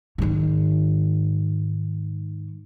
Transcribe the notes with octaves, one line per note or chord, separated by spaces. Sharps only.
G#2 D#3